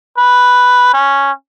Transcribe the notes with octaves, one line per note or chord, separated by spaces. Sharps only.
B4
C#4